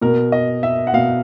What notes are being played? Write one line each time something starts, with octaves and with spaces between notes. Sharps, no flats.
B2 A#4
D#5
E5
F#5
B2 F5